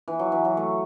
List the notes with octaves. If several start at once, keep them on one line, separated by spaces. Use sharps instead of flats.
E3
F#3
E3
F#3
A3